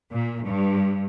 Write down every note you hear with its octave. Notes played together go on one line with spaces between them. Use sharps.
A#2
G2